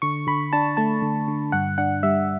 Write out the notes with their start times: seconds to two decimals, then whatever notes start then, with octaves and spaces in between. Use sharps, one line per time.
0.02 D3 C#6
0.27 D3 B5
0.53 D4 A5
0.77 A3 A5
1.02 D3
1.28 D3
1.52 G2 F#5
1.78 D4 F#5
2.03 G3 E5